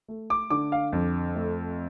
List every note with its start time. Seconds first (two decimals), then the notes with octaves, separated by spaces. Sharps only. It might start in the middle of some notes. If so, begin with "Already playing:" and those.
0.08 A3
0.30 D6
0.50 D3 D6
0.72 F5
0.92 F2
1.36 A3